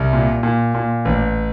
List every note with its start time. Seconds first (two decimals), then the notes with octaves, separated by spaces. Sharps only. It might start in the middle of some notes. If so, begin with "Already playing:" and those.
Already playing: C2
0.13 A#2
0.43 A#2
0.75 A#2
1.05 A1